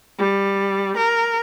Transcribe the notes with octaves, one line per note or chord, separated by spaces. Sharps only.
G3
A#4